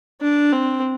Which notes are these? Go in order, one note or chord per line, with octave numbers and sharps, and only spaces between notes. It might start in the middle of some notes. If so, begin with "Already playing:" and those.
D4
C4